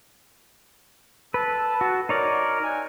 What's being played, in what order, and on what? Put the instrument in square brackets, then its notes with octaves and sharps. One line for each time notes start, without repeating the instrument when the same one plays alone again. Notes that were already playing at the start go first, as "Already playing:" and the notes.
[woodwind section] A4 A5 [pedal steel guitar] B4
[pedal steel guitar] F#4
[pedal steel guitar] D#4 C#5 D5 [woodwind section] A#4
[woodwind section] C3 F#4 G#5